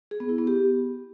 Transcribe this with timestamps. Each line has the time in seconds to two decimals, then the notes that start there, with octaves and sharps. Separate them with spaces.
0.11 G#4
0.20 B3
0.29 E4
0.38 B3
0.47 G4